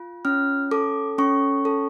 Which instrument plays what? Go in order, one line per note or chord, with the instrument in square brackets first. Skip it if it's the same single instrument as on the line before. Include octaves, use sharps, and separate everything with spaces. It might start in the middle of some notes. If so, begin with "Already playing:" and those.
Already playing: [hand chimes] F4
C#4 F6
A4 D6
C#4 C#6
A4